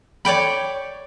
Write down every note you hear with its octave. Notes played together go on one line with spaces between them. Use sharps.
C#5 D5 G5 B5